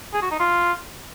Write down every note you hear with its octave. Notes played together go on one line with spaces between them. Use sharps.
G#4
F#4
D#4
F4